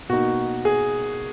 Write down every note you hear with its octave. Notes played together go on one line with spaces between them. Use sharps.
B2 A#3 D#4 F#4
G#4